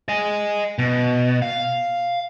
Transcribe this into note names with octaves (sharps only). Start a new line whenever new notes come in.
D#5 G#5
B2
F5